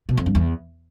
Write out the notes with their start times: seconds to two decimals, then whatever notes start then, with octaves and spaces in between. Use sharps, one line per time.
0.09 B2
0.17 F2
0.26 G2
0.35 E2